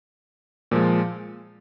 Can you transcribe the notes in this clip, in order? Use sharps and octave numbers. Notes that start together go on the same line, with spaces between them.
A#2 F3 G#3